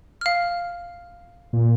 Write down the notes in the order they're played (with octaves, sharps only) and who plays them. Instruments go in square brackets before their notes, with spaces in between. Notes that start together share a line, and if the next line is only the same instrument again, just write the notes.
[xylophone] F5 F6
[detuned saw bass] A#2